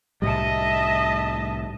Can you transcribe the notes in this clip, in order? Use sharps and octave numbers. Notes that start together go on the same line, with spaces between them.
C2 A2 G3 D#5 E5 A5